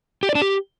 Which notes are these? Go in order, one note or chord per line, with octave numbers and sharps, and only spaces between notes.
G4
D5
D4
G4